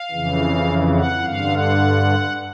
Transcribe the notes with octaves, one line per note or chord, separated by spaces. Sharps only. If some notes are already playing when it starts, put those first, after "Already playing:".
Already playing: F5
F2 C#3 E3
F#5
G2 D3 F5
F#5